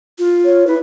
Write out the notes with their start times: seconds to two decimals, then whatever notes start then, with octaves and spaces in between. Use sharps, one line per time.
0.19 F4
0.45 C#5
0.67 E4 B4